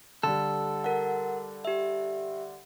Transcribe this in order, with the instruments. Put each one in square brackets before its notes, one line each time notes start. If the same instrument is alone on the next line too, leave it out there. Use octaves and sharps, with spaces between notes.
[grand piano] D3 G3 [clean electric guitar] A4
[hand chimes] A#4 F#5
G4 E5